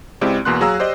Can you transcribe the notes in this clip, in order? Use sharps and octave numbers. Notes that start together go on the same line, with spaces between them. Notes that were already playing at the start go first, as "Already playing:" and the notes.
C#2 G#3 C4 E4 G4 D5
E2 B2 A#3 C6 F#6
F#3 G#4 F5 A#5 E6
G4 C5 D5 D#5